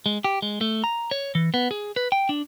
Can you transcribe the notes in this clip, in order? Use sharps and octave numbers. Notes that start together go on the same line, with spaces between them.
G#3
G4
G#3
A3
A#5
C#5
E3
B3
G#4
B4
G5
D4